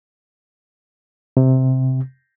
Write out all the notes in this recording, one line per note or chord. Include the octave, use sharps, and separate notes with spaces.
C3